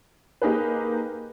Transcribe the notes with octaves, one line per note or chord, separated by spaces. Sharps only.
A#3 D#4 G4 G#4 A#4 B4